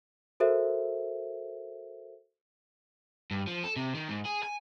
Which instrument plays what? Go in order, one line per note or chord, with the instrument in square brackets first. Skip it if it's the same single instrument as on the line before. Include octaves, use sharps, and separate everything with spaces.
[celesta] F#4 A4 A#4 C5 E5
[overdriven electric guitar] G2
F3
A4
C3
D#3
G#2
G#4
G#5